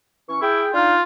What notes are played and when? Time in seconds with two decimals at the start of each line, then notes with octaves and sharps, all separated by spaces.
0.29 E3 C#4 C#6
0.41 E4 G#4 G5
0.74 D4 D#4 F4 F5